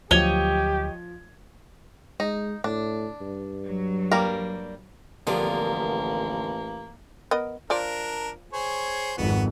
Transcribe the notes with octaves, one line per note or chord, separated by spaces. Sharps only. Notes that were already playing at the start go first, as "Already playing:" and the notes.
D2 F3 F#3 G4 C#5 D#5 G#6 G7
G#3 D#4
A2 D4
G2
F#3
G3 A#3 A#4
A1 D3 F3 G3 A#3 B3 A#4
B3 A#4 D#5
F3 D4 F4 A#4 D5
G#4 C5 C#5
G#1 F2 B3 F#4